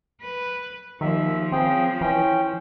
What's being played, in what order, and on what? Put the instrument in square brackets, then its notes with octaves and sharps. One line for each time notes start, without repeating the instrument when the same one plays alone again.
[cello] B4
[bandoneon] D#2 E5 [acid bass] D#3 [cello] F3
[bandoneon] C#3 G#4 G5 [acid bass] C4
[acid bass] E3 [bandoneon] C#4 G5